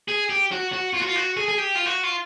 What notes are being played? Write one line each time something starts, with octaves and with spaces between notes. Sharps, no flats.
G#4
G4
F#4
F#4
F4
F#4
F4
F#4
G#4
G#4
G4
F4
F#4
F4